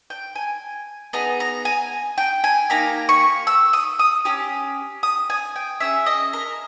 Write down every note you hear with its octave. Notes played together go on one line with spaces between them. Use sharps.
G5
G#5
B3 D#4 G#4 A#5
A#5
G#5
G5
G#5
A#3 D#4 G4 A#5
C#6
E6
D#6
D#6
C#4 G4
D#6
G#5
G5
C#4 G#4 E5
D#5
A#4